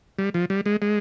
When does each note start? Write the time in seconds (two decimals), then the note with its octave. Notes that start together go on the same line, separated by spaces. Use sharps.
0.19 G3
0.34 F3
0.50 G3
0.66 G#3
0.82 G#3